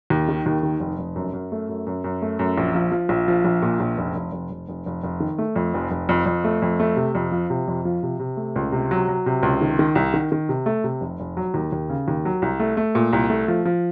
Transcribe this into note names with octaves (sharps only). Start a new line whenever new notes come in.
D#2
D#3
D#2
D#3
F1
F1
F#2
F#2
A3
F#2
F#2
F#2
A3
F#2
A#1
F3
F3
A#1
F3
A#1
A#2
A#1
F1
F1
F1
F1
F1
F1
F1
D#3
A3
F2
F1
F1
F2
F2
A3
F2
A3
C3
F2
F3
C3
F2
F3
C3
C3
A3
C#2
C3
F#3
F#3
C3
C#2
D#3
D#3
C2
D#3
D#3
C3
A3
C3
F1
F1
F#3
D#2
D#2
C#3
D#2
F#3
C2
A3
A3
A#2
C2
A3
F3
F3